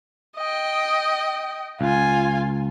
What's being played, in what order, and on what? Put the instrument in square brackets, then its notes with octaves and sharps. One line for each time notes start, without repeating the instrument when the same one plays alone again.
[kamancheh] D#5 G5
[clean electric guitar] C#2 [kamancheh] F4 G#5